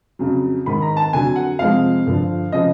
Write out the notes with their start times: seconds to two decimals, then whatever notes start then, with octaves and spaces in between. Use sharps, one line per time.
0.19 F2 C#3 F#3
0.66 G#2 D#3 G#3 B5
0.82 A#5
0.97 A5
1.13 F2 D3 F#3 G#5
1.36 F#5
1.59 F2 C3 F3 G#3 F5
2.06 G2 D3 F3
2.52 C#3 F3 D#5